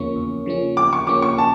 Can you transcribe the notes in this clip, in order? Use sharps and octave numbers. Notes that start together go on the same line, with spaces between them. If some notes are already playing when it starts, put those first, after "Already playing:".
Already playing: E2 C#3 F3 A#3 C#4 C#6
E2
C#3 F3 A#3 C#4
E2 D6
C#6
C#3 F3 A#3 C#4 D6
C#6
A5